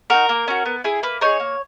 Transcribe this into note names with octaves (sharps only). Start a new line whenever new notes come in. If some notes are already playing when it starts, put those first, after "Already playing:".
D#4 F#4 A#4
A#3
C#4 F#4
B3
E4 G#4
A#3 B4
D#4 G#4 A#4 C#5
A#3